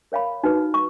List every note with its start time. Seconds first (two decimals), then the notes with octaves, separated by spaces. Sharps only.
0.12 A#4 C#5 F5 B5
0.43 D#4 F#4 B4
0.74 C#6